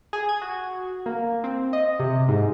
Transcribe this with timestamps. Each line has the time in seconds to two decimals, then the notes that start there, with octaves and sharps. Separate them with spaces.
0.13 G#4
0.29 G#6
0.42 F#4
1.06 A#3
1.44 C4
1.73 D#5
2.00 C3
2.28 G#2